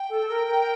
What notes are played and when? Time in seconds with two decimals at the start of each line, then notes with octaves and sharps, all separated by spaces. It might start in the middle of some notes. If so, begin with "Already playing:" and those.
Already playing: G5
0.08 A4
0.20 A4
0.28 A#4
0.48 A#4